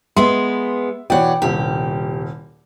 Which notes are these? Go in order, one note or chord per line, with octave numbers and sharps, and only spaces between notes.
G#3 B3 E5 C6
B2 E3 C#5 D5 F#5 G5
D#1 C2 G4